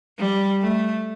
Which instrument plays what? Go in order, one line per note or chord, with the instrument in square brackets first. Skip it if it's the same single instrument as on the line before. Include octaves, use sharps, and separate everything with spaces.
[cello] G3
A3